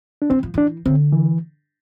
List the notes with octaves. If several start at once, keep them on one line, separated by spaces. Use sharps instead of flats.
D4
E3 C4
F3
E3 D4
D3 C4
E3